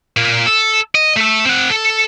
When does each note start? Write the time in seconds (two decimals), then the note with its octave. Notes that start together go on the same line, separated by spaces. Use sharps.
0.17 A#2 A#3
0.46 A4
0.95 D#5
1.17 A3 A4
1.45 C4 F#5
1.70 A4